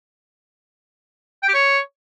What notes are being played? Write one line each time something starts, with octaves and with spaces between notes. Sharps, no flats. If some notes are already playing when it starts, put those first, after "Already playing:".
G5
G4
C#5